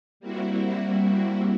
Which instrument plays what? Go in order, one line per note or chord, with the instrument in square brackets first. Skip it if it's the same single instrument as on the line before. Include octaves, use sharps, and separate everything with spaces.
[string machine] G3 A#3 C4 E4 F#4